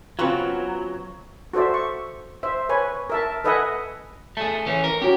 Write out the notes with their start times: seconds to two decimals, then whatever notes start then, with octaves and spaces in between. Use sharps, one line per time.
0.19 C#3 F#3 B3 C4 F4 B4 C#6
1.53 F#4 A4 C5 D5 E5
1.74 C#6
2.43 C5 E5
2.69 B4 C#5 G#5
3.10 A#4 E5 A5
3.44 A4 B4 D#5 E5 F#5 G#5
4.37 A3 G#4 A5
4.66 E3 C#4
4.84 A#4
5.02 C#4 F#4 G4